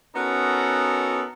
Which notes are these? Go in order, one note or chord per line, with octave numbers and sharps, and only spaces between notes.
B3 C#4 D#4 F#4 A4 A#4